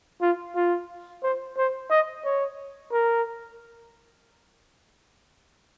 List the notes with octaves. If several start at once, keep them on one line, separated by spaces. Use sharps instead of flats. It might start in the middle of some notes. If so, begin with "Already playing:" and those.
F4
F4
C5
C5
D#5
C#5
A#4